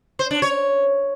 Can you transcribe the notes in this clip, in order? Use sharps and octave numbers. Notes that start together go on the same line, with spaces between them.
C5
D4
C#5